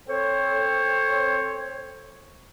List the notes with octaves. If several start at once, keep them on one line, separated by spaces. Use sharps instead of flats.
C4 A4 C5 C#5